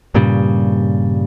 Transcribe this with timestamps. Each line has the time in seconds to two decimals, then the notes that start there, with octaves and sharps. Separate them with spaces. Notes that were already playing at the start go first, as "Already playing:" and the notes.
0.14 G2 A#2 C#3 G3